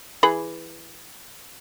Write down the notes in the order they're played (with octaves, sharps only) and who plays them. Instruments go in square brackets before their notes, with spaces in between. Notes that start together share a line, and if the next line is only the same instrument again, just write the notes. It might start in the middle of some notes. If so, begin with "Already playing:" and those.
[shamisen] E3 G#4 B5